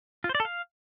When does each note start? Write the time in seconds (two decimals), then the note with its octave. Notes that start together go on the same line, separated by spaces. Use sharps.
0.24 F4
0.29 C5
0.35 D5
0.40 A4
0.45 F5